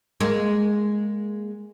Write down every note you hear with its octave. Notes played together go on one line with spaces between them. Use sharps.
G#3 A#3